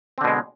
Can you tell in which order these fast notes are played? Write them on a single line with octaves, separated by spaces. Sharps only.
C4 D3 B2 G#3